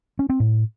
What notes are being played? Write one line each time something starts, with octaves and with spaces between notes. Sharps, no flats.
C#4
C4
A2